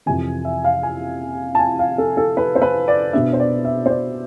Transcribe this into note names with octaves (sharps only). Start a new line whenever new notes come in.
F2 C3 E3 G#5
E5
F5
G#5
A5
G#5
F5
A4
A4
B4
C5
B4
D5
B2 B3 D4 E5
C5
D5
E5
C5
D5